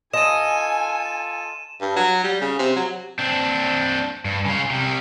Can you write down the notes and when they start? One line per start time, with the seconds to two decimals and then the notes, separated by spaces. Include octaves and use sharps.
0.14 F4 A4 D#5 G#5 D#7 E7
1.81 G2
1.96 F#3
2.24 G3
2.41 C#3
2.59 C3
2.76 F#3
3.19 C4 D4
4.25 G2
4.46 C#3 F4
4.70 C3 G3